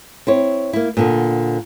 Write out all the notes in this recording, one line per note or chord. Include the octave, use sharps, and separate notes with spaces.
C4 E4 C#5
A#3 E4
A#2 D3 B3